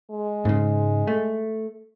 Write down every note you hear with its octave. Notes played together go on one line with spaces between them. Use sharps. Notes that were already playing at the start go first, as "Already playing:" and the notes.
G#3
G#2 C#3
A3